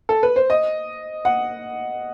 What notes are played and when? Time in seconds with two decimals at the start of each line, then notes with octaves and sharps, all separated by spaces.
0.09 A4
0.23 B4
0.36 C5
0.50 D#5
1.25 F#5